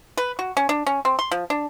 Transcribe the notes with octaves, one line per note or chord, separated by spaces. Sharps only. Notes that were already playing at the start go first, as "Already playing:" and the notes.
B4
F#4
C#4
D4
C#4
C4
C6
F3
D4